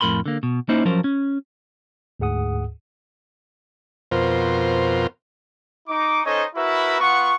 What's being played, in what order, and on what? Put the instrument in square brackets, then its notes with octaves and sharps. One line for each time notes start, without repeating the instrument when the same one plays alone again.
[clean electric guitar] F2 A2 A#4 B5 C6
D3 A#3
B2
A#3 C#4 D#4 E4 C5
F3 F#3 C#4 A#4 C5
C#4
[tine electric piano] D2 G#2 G#4 F#5 D#6
[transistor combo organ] F2 B2 F4 A#4 C5
[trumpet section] D#4 D6
C#4 D#4 A4 C5 C#5 D#5
E4 F#4 A#4 B4 E5
B3 F4 F#5 C#6